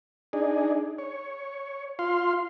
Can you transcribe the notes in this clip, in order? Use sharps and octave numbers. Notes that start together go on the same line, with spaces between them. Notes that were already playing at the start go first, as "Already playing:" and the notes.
D4 D#4 G#4
C#5
F4 F5 C6